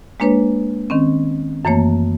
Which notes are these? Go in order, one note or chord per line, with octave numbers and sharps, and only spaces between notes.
G#3 A#3 D4 B4 C#5
D#3 C4 C#4
F#2 E3 A3 A#3 C#5